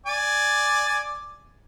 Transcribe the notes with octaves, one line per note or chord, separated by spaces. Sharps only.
D5 G#5 D6